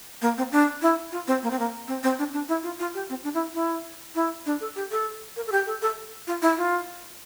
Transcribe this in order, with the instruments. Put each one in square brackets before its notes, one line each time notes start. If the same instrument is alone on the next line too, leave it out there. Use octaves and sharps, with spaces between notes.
[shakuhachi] A#3
C4
D4
E4
F4
C4
A#3
C4
A#3
C4
C4
D4
D4
E4
F4
F4
G4
C4
D4
E4
E4
E4
D4
A4
G4
A4
A#4
A4
G4
A4
A4
F4
E4
F4